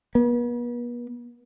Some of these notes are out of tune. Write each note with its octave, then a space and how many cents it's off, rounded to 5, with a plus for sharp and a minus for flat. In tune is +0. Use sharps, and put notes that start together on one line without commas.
B3 -40